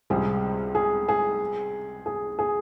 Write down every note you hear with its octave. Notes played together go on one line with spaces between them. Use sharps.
C#2 C3 G3 C4 G#4
G#4
G#4
G#4
G#4